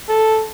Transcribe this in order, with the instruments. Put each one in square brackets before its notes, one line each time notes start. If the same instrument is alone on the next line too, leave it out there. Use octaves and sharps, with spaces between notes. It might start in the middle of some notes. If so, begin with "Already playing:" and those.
[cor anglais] A4